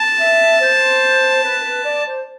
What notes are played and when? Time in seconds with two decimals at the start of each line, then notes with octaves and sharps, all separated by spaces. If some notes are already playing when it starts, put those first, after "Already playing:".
Already playing: A5
0.19 E5
0.61 C5
1.43 B4
1.64 B4
1.85 D5
2.06 C5